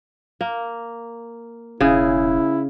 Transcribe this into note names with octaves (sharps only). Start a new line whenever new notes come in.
A#3
E1 C#3 E4 G#4